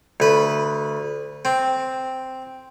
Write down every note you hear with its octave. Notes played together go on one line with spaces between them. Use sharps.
D2 B4
C4